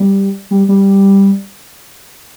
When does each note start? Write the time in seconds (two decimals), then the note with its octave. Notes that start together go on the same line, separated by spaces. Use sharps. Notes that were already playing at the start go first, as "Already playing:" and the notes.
Already playing: G3
0.51 G3
0.68 G3